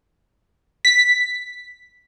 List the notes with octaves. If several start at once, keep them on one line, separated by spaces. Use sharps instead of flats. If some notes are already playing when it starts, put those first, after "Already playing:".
B6